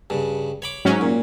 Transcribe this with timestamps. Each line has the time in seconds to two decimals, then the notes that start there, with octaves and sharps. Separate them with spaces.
0.10 G2 C#3
0.62 C#5 B5 D6
0.85 G#2 F#3 C#4
1.01 A#2